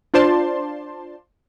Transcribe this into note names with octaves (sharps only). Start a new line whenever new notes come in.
D4 F4 C5 D5 A5 C6